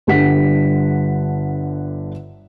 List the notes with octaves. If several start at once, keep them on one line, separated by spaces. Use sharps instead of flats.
G1 D3 G3 F#5 B6